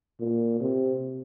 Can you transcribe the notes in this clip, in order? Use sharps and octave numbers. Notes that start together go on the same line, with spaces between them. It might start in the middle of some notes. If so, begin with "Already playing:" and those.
A#2
C3